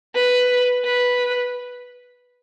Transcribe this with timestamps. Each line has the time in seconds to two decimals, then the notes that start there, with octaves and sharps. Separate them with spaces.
0.15 B4
0.84 B4